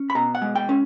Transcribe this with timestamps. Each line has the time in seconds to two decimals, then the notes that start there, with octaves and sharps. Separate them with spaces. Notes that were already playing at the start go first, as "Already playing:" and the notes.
Already playing: C#4
0.10 B5
0.15 B2 A#5
0.35 F#5
0.42 G#3
0.56 G5
0.69 C#4